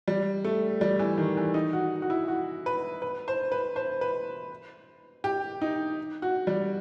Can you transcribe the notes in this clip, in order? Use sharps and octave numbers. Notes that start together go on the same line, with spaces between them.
G3
A3
G3
E3
D#3
E3
D#4
F#4
F#4
E4
F#4
B4
B4
C5
B4
C5
B4
G4
D#4
F#4
G3